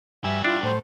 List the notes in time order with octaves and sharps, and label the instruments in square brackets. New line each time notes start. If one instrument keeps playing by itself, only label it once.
[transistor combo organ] G2 G#5 E6 [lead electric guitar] G3 F#4 [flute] E5
[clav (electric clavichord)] D4 [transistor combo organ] E4 [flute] F4
[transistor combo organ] A2 [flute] C5